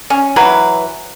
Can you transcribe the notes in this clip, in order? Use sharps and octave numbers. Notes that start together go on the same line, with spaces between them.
C#4
E3 F#3 B4